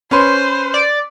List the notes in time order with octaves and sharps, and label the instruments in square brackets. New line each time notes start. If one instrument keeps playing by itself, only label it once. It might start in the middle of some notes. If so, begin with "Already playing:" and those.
[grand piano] C#4 B4 C6 [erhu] C5
[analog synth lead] D5